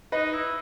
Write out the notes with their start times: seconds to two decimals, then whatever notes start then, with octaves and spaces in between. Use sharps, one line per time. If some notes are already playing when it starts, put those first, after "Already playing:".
0.12 D#4 B4 D#5
0.34 E4